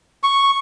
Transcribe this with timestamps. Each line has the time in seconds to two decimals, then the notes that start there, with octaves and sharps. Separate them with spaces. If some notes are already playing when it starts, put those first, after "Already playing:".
0.23 C#6